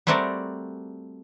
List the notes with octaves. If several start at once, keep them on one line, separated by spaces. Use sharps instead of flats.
G3 A3 C4 F#4 A#4 D5